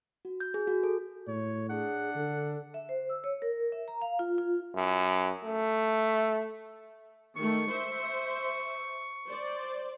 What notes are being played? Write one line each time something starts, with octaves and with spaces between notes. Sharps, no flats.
F#4
G6
G#4
F#4
A4
A2 C#5
D4 G#4 F#5
D3 A4
E5
C5
E6
C#5
A#4
E5
A#5
F5
F4
F4
F#2
A3
D#3 A3 C#6
C5 E5
C5 D5